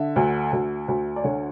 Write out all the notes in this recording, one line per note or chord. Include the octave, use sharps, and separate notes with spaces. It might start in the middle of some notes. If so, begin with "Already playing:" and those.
Already playing: D3 E5
D2
D2
D2
D5
D3 C#5